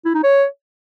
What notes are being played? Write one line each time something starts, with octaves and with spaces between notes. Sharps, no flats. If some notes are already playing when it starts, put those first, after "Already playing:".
E4
D#4
C#5